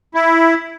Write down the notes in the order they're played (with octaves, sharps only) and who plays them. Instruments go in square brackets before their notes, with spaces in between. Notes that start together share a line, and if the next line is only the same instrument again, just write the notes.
[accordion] E4